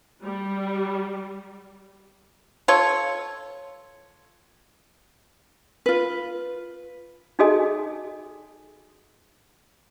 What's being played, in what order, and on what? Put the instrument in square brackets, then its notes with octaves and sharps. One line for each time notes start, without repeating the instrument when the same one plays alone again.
[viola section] G3
[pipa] F4 A4 C#5
[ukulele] F4 B4
[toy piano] D#4 F#4 G#4 A4 D#5 G#5